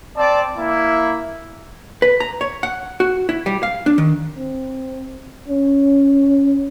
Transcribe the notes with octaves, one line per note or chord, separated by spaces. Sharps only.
C4 D5 A5
A#3 E4
B4
A#5
C#5
F#5
F#4
E4
G3
F5
D4
D#3
C4
C#4